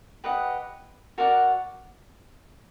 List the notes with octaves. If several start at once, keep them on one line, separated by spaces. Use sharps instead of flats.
G4 B4 D#5 F#5
F#4 A#4 D5 F#5